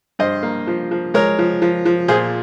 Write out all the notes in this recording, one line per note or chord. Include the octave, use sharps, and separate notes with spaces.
G2 C5 D#5
A#3
F3
F3
G#3 A#4 C#5
F3
F3
F3
A#2 G#4 C5